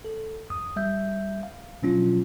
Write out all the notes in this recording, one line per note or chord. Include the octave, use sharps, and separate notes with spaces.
A4
F2 D#6
G3 E5 G6
F5
B2 F3 F#3 C#4 D4 F4